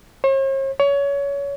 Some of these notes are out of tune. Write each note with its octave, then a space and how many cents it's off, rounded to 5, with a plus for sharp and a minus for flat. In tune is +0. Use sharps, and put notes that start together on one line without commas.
C#5 -45
C#5 +25